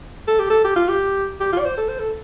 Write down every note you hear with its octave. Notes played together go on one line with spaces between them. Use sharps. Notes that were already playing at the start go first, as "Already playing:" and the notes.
A4
G4
A4
G4
F4
G4
G4
F4
D5
C5
A4
C5
A4